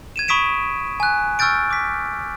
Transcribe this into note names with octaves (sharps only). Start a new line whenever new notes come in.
G#6 D#7 E7
B5 C#6 D#6 B6 D7 E7
G#5 F#6
C#6 E6 F6 G6 A6 D7
D6 B6